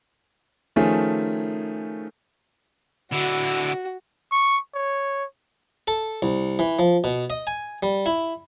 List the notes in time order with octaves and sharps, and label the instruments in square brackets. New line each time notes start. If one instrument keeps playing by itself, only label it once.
[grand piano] D#3 F3 A3 C#4 G#4
[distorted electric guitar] D3 E4 [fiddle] F#4
[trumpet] C#6
C#5
[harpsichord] A4
C2
E3
F3
B2
D#5
G#5
G3
E4